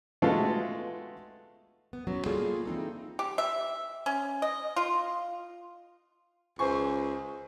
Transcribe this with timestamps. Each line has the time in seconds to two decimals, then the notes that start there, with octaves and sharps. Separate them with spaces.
0.22 G#3 A3 B3 F4 F#4 A4
1.93 B3
2.07 F#3 B3 C#4
2.26 G3 A#3 F4 G#4 A4
2.66 E3 C4 D#4 A4
3.19 G4
3.38 E5
4.06 C#4
4.42 D#5
4.76 F4
6.59 C#2 C5 G#5 C#6